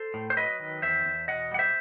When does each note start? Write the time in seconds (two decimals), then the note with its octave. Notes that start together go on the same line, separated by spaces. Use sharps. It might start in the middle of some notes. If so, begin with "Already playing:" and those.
Already playing: A4 C5
0.14 A2
0.30 C5
0.37 F#3 B4 D#5
0.60 D#3
0.82 E2 C5 E5
1.05 E2
1.28 B2 D#5 F#5
1.51 G3 F#5
1.59 C5 E5